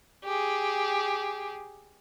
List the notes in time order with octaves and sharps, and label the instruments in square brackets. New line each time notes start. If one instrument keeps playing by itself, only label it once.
[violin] G4 G#4